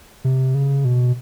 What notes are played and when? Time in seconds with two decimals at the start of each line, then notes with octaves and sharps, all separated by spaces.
0.24 C3
0.55 C#3
0.85 B2